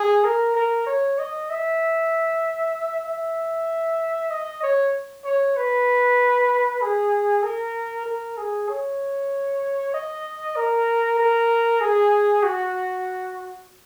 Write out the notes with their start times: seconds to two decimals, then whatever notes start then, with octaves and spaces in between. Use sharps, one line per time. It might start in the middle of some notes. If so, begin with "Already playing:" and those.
Already playing: G#4
0.24 A#4
0.55 A#4
0.86 C#5
1.19 D#5
1.50 E5
3.07 E5
4.30 D#5
4.63 C#5
5.24 C#5
5.57 B4
6.82 G#4
7.43 A#4
8.06 A#4
8.37 G#4
8.69 C#5
9.94 D#5
10.56 A#4
11.18 A#4
11.81 G#4
12.43 F#4